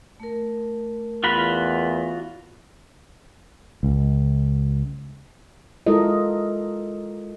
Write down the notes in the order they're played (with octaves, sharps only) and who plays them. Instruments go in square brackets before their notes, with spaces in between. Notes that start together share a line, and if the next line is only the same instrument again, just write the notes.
[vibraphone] A3 A#4
[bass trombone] E2 [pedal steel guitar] F4 F#4 B5
[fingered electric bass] C#2
[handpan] G#3 E4 F4 A4 A#4 D#5